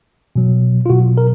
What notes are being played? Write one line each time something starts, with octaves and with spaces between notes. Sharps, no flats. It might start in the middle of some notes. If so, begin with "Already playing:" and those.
B2 F#3
F4
B2 F#3 F#4
A#4